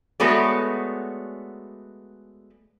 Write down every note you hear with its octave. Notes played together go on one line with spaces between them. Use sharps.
G#3 A3 B3 F#4 C#5 D5